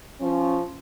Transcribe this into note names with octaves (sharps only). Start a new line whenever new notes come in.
F3 C#4